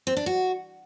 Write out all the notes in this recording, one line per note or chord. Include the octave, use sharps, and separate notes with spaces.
C4
D4
F#4